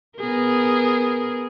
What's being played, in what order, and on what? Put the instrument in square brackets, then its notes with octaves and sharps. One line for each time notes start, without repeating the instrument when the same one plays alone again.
[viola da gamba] B3 G#4 A#4